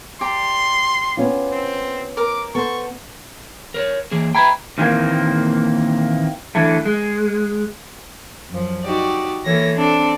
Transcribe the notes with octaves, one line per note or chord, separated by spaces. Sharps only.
G4 D5 A#5 C6
B3 C#4 F4
C4
A#4 D6
B3 A4 C5 C#6
A#4 C5 C#5
E3 A#3 G#4
B4 E5 G5 A#5 B5 G#6
A#2 D#3 E3 G3 A#3 C4
D3 E3 A3
G#3
F#2 F3
D#4 F#4 G4 D5
E3 A#3 A4 C#5 A#6
C4 D4 A4